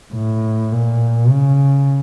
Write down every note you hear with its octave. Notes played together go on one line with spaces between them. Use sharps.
A2
A#2
C#3